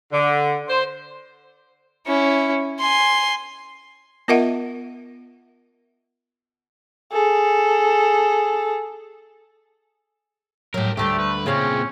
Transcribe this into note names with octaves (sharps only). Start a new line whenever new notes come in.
D3
C5
C#4 E4
G#5 C6
B3 F4 A#4 D#5 E5 F#5
G#4 A4
A2 F#3 G4 A#4
D2 D3 G3 A3 G4
B4
A#2 C#3 C4 C#4 G#4 F5